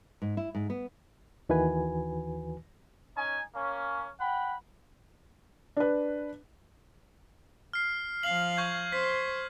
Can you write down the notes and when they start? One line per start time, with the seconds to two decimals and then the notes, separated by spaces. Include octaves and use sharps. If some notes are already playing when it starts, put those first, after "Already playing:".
0.22 G#2
0.37 E4
0.55 G#2
0.70 B3
1.49 D#2 D#3 E3 F#4 B4 G#5
3.16 C#4 D#4 G#5
3.55 A#3 C#4
4.20 F#5 G5 B5
5.77 D4 B4
7.73 F6 C7
8.23 F3 F5 F#7
8.57 C#6 G6 G#6
8.92 C5 B6